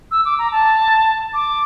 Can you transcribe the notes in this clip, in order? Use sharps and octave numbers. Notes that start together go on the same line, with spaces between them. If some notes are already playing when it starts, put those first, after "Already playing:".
E6
D6
A#5
A5
D6